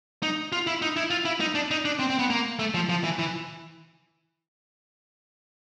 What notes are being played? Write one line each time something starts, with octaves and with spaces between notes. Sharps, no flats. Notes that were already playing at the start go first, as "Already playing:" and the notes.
D#4
F4
E4
D#4
E4
F4
E4
D#4
D4
D#4
D4
C4
C4
B3
A#3
A3
F3
F3
E3
E3